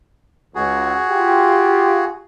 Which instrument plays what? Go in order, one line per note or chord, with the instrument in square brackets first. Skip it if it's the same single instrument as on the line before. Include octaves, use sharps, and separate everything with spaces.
[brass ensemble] C#2 [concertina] F#4 G#4
[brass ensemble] F4 G4